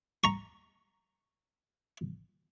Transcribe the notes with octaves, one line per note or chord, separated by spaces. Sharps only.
A#5 C#6